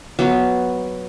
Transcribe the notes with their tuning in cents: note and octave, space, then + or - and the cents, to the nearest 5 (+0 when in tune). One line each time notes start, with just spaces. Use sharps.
F#3 +0 B3 +0